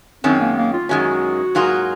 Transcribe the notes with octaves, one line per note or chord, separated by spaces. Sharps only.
F#2 D#3 G#3 C4 C#4
A#3
A#3
F4
F#2 D#3 G#3 C#4 F#4
G#2 F#3 A#3 F4 G#4